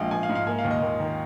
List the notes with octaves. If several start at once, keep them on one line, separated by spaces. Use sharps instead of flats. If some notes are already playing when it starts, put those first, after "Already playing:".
Already playing: A#1 G#3 F5
A#1 G#5
F5
G#2
F5
A#3 G#5
F5
D#2
D#5
D#2
D#3